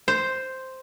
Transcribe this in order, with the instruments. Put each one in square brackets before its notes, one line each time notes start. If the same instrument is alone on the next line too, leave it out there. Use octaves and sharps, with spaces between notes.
[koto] C5